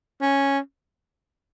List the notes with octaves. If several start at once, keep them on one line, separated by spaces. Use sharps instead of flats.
C#4